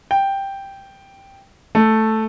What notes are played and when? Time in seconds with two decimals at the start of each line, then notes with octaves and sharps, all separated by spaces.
0.11 G5
1.75 A3